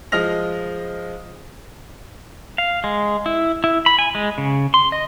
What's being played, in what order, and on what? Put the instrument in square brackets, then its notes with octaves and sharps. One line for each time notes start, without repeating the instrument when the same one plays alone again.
[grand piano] F3 G#3 D#5 F6 A#6 F7
[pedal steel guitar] F5
G#3
E4
E4
B5
G#5
G#3
C#3
C6
D#5